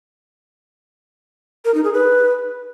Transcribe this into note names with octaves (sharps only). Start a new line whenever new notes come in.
A#4
D#4
G#4
B4